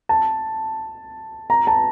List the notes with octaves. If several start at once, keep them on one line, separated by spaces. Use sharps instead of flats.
A5
A#5
A5